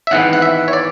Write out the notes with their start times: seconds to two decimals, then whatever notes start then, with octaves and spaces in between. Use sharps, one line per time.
0.07 E5
0.11 G#1 G#2 E3 B3 F#5
0.33 F#5
0.42 E5
0.68 C#5
0.73 D5